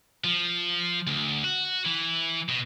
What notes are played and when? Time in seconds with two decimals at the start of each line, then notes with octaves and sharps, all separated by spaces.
0.24 F3
1.07 D2
1.44 F#4
1.85 E3
2.49 B2